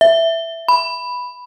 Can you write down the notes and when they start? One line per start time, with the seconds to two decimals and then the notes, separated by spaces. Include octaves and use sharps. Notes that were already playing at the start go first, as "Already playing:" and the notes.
0.01 E5
0.68 B5